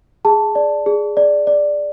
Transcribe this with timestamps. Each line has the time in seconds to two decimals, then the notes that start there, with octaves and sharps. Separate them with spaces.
0.25 G#4 A5
0.55 D5
0.86 G#4
1.17 D5
1.47 D5